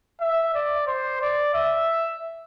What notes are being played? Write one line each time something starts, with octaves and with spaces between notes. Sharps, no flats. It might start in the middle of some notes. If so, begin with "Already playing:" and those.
E5
D5
C5
D5
E5